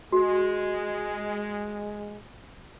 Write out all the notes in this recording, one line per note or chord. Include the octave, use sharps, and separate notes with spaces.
G#3 F#4